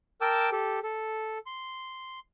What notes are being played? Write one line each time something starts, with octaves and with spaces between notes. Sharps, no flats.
A#4 G5 A5 D6 E6
G4 A4
A4
C6